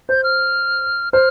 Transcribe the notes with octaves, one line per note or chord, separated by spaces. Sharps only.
C5 G6
F6
C5 F6